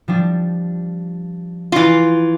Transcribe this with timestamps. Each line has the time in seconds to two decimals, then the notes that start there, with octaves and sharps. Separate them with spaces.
0.08 F3 G3 D4
1.72 E3 F4 C#6